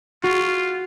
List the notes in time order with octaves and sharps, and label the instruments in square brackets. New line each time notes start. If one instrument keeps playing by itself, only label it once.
[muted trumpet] F4 [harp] F#4